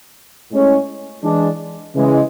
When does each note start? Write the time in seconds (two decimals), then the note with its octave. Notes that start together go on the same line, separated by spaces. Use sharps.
0.51 A2 G#3 C#4
1.23 E3 G#3 D4
1.95 C#3 E3 G#3